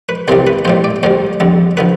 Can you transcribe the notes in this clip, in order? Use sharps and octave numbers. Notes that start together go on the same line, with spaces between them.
B4
C2 C3 E3 G3 C5
B4
A1 A2 G3 C5
D5
D2 D3 G3 C5
F2 D3 G3
D3 F3 B4